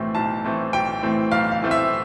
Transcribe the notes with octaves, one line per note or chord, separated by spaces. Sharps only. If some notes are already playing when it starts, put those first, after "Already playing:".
Already playing: B1 A2 E3 A3 C4
B1 A5
A2 E3 A3 C4
B1 G5
A2 E3 A3 C4
B1 F5
F5
A2 E3 A3 C4
E5